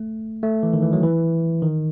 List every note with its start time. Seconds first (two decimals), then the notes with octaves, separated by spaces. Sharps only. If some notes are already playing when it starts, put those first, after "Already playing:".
Already playing: A3
0.43 A3
0.63 E3
0.73 D#3
0.83 E3
0.93 F#3
1.03 E3
1.62 D#3